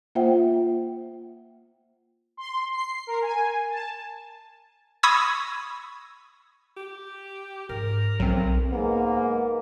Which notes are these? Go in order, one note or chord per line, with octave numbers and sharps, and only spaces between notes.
A#3 F4 C5 E5 F#5 G5
C6
C7
A#4
G#5
A5
B5 C#6 D#6 E6 G#6 A#6
G4
G#2 A#4
B1 D#3 F#3 C4
G#2 A#3 B3